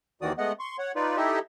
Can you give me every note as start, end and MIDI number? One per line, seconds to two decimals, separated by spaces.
0.22 0.32 39
0.22 0.32 51
0.22 0.32 52
0.22 0.32 66
0.22 0.32 74
0.22 0.32 87
0.38 0.52 56
0.38 0.52 57
0.38 0.52 59
0.38 0.52 75
0.38 0.52 78
0.59 0.77 84
0.59 0.77 85
0.79 0.92 73
0.79 0.92 78
0.96 1.17 63
0.96 1.17 65
0.96 1.17 71
0.96 1.17 74
1.17 1.39 63
1.17 1.39 64
1.17 1.39 67
1.17 1.39 69
1.17 1.39 75
1.17 1.39 76